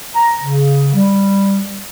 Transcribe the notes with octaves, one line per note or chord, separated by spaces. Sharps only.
A#5
C#3
G3